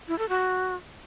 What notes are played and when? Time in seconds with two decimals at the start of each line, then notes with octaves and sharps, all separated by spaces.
0.08 E4
0.19 A4
0.29 F#4